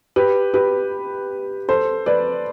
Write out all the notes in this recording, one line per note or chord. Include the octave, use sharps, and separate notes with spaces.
G4 B4
G4 B4
A4 C5
B4 D5